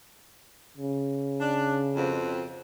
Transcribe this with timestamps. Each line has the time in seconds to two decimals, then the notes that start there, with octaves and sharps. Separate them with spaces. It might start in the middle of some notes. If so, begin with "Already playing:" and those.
0.77 C#3
1.39 D4
1.96 F2 B2 C4